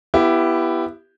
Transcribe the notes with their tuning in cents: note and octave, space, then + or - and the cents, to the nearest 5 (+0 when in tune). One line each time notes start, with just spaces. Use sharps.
B3 -5 E4 +15 G4 +0